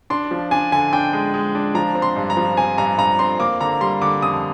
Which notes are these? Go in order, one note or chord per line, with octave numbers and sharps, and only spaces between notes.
D4 C6
F3
D4 G#5
D3 G#5
D4 G5
G#3
G#3
D4
F3 A#5
C4
C6
G2
A#5
F3
C4 G#5
G2 A#5
G2 A#5
C4 C6
A#3 D6
D3 A#5
G3 C6
D3 D6
F2 D#6